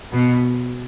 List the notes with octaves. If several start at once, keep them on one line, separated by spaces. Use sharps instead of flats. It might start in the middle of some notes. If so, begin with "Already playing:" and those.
B2